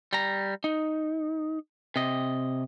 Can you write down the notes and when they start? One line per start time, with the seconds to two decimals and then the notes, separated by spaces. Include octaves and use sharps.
0.13 G3 A#5
0.64 D#4
1.96 C3 D#5